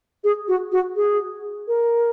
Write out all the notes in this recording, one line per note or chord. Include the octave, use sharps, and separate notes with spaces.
G#4
F#4
F#4
G#4
A#4